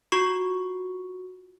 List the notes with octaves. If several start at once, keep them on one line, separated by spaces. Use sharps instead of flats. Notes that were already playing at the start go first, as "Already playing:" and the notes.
F4 F#4 C#6